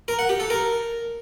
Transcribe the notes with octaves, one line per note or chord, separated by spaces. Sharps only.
A#4
F#5
G4
A4
A#4